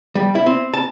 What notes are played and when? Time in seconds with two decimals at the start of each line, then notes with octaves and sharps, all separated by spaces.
0.15 G3
0.35 E4
0.46 C4
0.74 A5